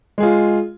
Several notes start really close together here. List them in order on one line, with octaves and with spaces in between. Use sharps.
G#3 G#4 F4